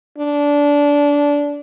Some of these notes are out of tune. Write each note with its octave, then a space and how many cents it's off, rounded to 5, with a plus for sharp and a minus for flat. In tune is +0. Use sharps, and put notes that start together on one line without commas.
D4 -20